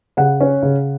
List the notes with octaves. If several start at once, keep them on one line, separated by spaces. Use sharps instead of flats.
C#3 F#5
C#4
C#3